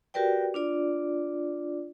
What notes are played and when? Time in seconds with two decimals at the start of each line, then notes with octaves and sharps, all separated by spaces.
0.14 F#4 G4 A#4 B4 D5 G5
0.54 D4 F4 D5